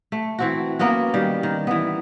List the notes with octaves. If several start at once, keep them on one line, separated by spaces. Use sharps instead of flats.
A3
E3 C4 F#4
A#3 B3 C#4 F#4
D#3 G3
D#3
E3 B3